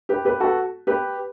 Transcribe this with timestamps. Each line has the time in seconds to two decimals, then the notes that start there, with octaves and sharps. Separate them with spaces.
0.09 G4 B4
0.25 G4 B4
0.40 F#4 A4
0.87 G4 B4